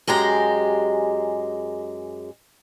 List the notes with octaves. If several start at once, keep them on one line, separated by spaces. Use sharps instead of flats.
F#2 G#3 G4 G#4 A#5